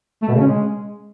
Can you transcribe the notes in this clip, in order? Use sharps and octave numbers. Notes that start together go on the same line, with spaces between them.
A3
B2
C#3
C#4
G#3